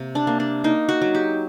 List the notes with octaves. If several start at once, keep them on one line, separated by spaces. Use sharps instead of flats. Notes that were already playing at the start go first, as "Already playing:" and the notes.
Already playing: C3 A#3
D4
A#3
D4
A#3 D#4
F#4
F#3
G4